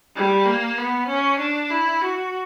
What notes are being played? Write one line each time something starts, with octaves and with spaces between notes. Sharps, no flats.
G3
A#3
B3
C#4
D4
E4
F#4